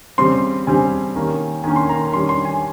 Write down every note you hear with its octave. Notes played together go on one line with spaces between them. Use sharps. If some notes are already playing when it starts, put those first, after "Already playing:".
C#3 G3 C4 C6
C#3 G3 C4 G#5
D#3 A#3 C#4
D#3 A#3 C#4 G#5
C6
A#5
C6
D#3 G3 C#4 C6
C6
G#5